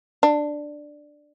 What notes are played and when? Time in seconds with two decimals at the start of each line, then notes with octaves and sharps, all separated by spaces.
0.23 D4